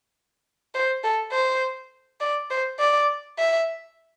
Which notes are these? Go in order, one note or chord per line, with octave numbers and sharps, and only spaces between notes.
C5
A4
C5
D5
C5
D5
E5